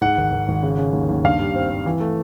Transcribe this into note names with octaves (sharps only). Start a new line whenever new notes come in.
G#2 F#5
G#1
G#1
G#1
C#3
C#3
D#2
D#2
G2 F5
G3
C4
C4
E3
A3